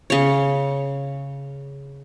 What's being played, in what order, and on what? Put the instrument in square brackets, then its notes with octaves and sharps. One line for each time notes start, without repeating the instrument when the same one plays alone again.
[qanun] C#3 C#5